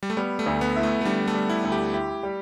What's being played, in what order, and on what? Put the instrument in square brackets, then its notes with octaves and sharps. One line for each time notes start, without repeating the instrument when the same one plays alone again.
[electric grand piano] G3
A3
[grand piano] G3 [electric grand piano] B3
[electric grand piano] A3
[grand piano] D2
[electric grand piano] B3
[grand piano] E4
[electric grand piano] A3
A3
[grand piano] D3 [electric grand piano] G3
[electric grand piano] A3
[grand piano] G3
[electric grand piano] E4
[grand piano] D2
[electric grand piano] G4
[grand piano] E4 [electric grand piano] G4
[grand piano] G3